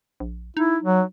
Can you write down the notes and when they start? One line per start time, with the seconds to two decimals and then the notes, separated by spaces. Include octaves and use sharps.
0.20 A#1
0.57 D#4 E4
0.83 F#3